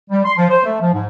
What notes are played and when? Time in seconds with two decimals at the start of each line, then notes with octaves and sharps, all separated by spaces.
0.10 G3
0.25 C6
0.38 F3
0.50 C5
0.64 A3
0.80 F3
0.93 G#2